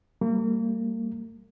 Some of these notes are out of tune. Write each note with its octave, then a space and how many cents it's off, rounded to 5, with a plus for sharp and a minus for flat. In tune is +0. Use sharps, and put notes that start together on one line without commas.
G3 +0 A#3 -35